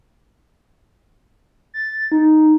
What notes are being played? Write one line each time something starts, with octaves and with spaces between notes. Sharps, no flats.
A6
D#4